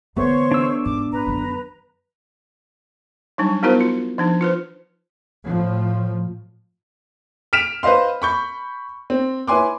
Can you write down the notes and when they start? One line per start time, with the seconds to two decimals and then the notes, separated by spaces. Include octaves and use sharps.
0.16 D3 E3 A3 B3 C5 C#5 C#6
0.51 D4 E6
0.86 G#2 D6
1.12 G#2 B4 A#5
1.27 F#2 D3
3.38 F#3 G3 D4 D#4
3.63 B3 D#4 E4 F#4 A#4 C5
3.81 F4
4.18 F3 D4 D#4
4.41 F4 B4 C5
5.45 A2 F3
7.53 F6 B6 D7 E7 F7
7.83 B4 C5 D#5 F5 C6
8.22 B5 C#6 G6
9.10 C4
9.47 E4 B4 C#5 G#5 C6 D6